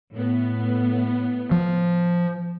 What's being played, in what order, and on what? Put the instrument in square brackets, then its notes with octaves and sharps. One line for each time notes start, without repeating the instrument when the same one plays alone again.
[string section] A2 B3
[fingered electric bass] F3